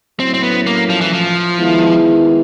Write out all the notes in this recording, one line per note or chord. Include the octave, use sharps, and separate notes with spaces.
A2 F#3 A3 C4 C#4 E4
C4
B3
A#3
F3
E3
F3
D#3 G#3 B3 E4